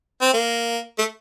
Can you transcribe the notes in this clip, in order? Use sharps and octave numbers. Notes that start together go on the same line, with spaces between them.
C4
A#3
A3